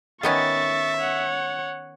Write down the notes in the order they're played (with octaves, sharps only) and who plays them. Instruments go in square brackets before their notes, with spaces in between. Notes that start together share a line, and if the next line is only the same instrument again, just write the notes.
[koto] D#3 B3 C#4 [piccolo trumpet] E5 [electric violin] C#6 A6
[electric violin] C#5 F#5